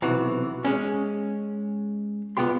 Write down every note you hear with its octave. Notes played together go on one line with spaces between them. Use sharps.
B1 C3 E3 F#4
G#3 C#4
C2 G#2 B3 F4 G4 C6